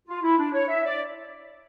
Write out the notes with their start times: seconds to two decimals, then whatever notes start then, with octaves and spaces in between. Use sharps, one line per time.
0.08 F4
0.23 E4
0.39 D4
0.54 C#5
0.69 E5
0.85 D5